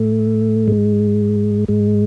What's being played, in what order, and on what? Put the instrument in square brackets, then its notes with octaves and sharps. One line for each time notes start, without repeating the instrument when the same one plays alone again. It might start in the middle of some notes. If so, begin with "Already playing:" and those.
Already playing: [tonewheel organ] A2 A3
G#2 G#3
G#2 G#3